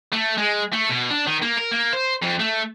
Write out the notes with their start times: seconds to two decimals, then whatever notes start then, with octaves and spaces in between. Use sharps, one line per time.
0.13 A3
0.38 G#3
0.73 A3
0.90 B2
1.10 D4
1.27 D#3
1.42 A#3
1.57 A#4
1.71 A#3
1.93 C5
2.22 F2
2.39 A3